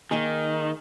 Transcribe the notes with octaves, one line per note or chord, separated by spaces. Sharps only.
D#3 A#3 D#4 G#4